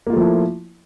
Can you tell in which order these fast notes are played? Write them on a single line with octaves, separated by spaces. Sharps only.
A#3 F4 A3 F3 E4